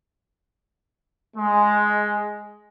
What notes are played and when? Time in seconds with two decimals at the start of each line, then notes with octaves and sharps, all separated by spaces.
1.37 G#3